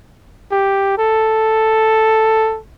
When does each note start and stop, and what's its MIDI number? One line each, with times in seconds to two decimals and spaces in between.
0.52 0.93 67
0.98 2.59 69